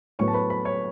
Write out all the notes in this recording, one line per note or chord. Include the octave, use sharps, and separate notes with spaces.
A2 F#3 B3 C#5 C#6
A5
B4 B5
B4 B5
C#5 C#6